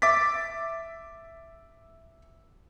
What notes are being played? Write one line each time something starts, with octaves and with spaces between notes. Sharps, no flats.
E5 D6 A6 B6